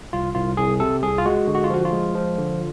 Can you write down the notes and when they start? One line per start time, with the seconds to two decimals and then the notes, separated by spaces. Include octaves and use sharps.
0.13 C2 F4
0.35 C2 F4
0.57 C2 G#4
0.80 C3 A4
1.03 C2 G#4
1.18 F4
1.25 G#3 F#4
1.47 D3
1.55 F#4
1.64 F4
1.70 F3 F#4
1.85 F4
1.92 G#3
2.15 F3
2.38 D3